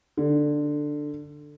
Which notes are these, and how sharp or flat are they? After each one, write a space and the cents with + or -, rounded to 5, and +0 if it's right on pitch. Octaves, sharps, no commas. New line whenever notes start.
D3 +10